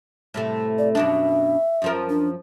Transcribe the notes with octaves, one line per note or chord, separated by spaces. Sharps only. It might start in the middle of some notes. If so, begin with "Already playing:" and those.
A2 C3 A3
D5
F#2 B2 D4 E5
F#2 F3 A#4
D4